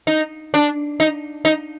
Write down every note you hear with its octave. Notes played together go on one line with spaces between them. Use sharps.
D#4
D4
D#4
D#4